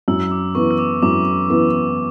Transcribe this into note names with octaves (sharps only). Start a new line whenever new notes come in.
F#2 E6
D6
E3 B3 C#6
E6
D6
F#2 D6
E3 B3